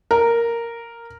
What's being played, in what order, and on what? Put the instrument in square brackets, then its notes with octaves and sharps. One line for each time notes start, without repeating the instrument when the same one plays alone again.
[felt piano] A#4